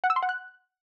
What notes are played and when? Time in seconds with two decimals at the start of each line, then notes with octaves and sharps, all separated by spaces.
0.04 F#5
0.10 E6
0.16 C6
0.23 F#5
0.29 F#6